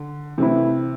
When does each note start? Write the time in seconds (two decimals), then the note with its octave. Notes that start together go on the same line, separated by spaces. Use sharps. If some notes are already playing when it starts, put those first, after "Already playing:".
Already playing: D3
0.38 C3 E3 A3 C4 E4